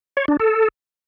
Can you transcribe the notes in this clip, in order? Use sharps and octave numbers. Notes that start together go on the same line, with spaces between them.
C#5
D4
A4